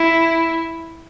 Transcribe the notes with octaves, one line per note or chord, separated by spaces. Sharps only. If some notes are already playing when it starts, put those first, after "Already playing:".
Already playing: E4